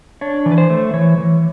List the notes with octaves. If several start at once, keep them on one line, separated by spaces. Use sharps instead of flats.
D4 C#5
E3
B4
C5
A3
E3 C#5
E3